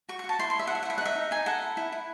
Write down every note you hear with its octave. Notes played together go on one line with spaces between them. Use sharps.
F#4 C#6
C#6
F#4
A5
E4 C6
C6
C#5 E5
A4 F#5
E5
F#5
E4 E5
F#5
D#4 E5
D#4
D#4 G#5
A4 F#5
E4
E4
E4